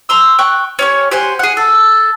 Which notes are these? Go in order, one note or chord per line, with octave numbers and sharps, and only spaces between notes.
A#5 C6 E6
G5 C#6 F#6
C#4 G4 C#5
G4 C5 F#5 G#5
G#4 F#5
A4